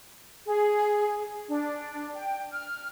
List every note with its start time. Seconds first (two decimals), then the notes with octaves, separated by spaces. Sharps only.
0.46 G#4
1.47 D4
2.13 G5
2.52 F6